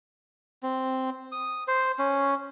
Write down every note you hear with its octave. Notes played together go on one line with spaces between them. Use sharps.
C4
D#6
C5
C#4